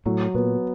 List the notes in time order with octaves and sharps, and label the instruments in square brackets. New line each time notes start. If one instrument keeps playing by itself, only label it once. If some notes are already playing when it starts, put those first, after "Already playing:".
[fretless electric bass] A2 [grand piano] F#3
[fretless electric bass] A#2 [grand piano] B3